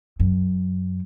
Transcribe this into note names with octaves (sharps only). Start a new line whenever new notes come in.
F#2